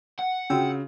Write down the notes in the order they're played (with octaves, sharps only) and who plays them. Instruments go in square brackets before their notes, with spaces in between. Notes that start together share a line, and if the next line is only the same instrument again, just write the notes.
[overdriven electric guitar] F#5
[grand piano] C#3 [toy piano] D4 F4 F#4 [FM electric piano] G5 E6